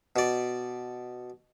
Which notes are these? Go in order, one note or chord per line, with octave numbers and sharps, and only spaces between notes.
B2 D5